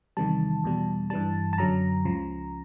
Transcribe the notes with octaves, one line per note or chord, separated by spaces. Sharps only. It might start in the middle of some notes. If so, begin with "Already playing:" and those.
E2 C3 D#3 G3 A5
E2 B2 G3
G2 E3 G3 A5
A5
F#2 D3 F#3 A#5
C#2 C#3 F3